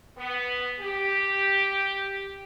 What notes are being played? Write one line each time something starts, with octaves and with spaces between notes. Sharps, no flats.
B3
G4